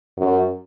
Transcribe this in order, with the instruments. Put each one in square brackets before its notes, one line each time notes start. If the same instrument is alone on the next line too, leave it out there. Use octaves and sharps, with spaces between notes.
[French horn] F#2